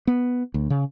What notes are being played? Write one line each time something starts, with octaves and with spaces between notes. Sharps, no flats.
B3
D2
C#3